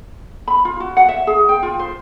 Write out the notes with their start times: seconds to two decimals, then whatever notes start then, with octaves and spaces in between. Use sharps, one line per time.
0.48 B5
0.65 F4
0.80 F#4
0.97 F#5
1.09 E5
1.27 G#4
1.49 G5
1.63 F4
1.79 C5